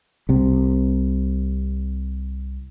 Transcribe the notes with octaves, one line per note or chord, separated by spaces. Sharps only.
C2 C3